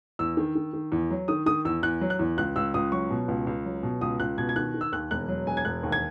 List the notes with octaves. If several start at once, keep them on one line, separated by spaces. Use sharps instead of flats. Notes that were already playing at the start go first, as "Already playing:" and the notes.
E2 E6
D#3
D#3
D#3
E2
F#3
D#3 D#6
D#3 D#6
E2 E6
E2 F#6
F#3
F#6
E2
C#2 F#6
C#2 E6
C#2 D#6
F#3 C#6
B2
C#2
C#2
F#3
B2
C#2 D#6
C#2 F#6
B2 G#6
G#6
D#3 F#6
D#3
E6
D#2 F#6
E1 F#6
F#3
E1 G#5
G#6
E1 F#6
D#2
G#6